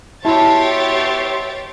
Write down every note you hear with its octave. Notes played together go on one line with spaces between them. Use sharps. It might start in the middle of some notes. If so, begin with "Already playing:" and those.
B2 E4 G4 C#5 E5 A5 C6 A6